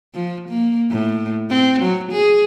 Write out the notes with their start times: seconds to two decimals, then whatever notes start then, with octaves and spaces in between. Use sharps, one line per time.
0.15 F3
0.49 A#3
0.91 A2
1.50 C4
1.82 F#3
2.12 G#4